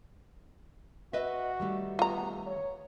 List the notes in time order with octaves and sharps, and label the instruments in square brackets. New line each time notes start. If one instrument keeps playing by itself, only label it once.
[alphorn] F#4 [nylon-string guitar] B4 D#5 E5
[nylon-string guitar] D#3 G3 A3
[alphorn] B3 [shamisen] F4 A#5
[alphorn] C#5